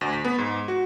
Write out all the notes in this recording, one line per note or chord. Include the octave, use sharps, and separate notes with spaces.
D2
B6
B3
G#2
F#4